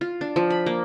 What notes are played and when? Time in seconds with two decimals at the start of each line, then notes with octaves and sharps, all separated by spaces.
0.01 F4
0.21 D4
0.36 F3
0.50 B5
0.66 A#3